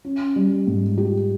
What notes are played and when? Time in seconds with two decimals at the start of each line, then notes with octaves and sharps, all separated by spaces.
0.05 C#4
0.36 G3
0.67 G#2
0.98 G4